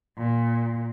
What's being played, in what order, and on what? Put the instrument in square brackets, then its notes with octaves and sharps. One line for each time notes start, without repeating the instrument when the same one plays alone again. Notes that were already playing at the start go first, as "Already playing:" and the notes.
[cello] A#2